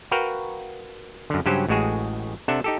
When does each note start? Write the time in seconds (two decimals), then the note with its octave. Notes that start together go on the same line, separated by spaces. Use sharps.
0.11 F#4 A#4 B4 F5 G5
1.30 F#2 D3
1.46 G2 C#3 F#3 C#4 G4 C5
1.68 A1 A2 G#3 F#4 G#4
2.48 C3 D4 A4 E5 F#5
2.64 D#4 G4 A4